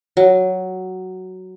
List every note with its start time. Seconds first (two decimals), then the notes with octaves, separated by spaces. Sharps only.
0.17 F#3